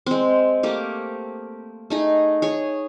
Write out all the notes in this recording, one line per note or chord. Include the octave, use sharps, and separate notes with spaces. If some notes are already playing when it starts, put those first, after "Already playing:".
G#3 C4
A3 A#3 G4
A3 D#4 G#4
G#4 C#5